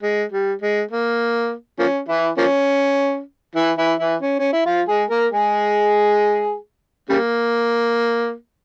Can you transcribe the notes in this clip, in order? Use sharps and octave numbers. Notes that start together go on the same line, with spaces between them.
G#3
G3
G#3
A#3
F3 A#3 C#4
E3 E4
F3 A#3 C#4
E3 E4
E3 E4
E3 E4
C#4
C#4
E4
F3 F4
G#3 G#4
A#3 A#4
G#3 G#4
C#3 G3 A#3